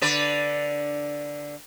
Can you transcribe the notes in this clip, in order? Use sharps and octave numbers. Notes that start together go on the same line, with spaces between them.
D3 B4 D5